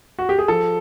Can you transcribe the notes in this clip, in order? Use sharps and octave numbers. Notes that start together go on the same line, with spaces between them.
F#4
G4
G#4
F3 A4